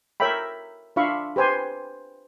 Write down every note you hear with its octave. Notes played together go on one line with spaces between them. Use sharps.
A#4 C#5 E5 G5 B5
D4 F4 E5 F5 B5 C#6
G4 B4 C5 G#5